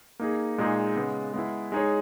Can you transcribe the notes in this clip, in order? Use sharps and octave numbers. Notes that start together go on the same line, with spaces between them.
A#3 D#4 G#4
A#2 G#3 D#4 G#4
C#3 G#3 B3
G#3 B3 E4
G#3 D#4 G#4 C#5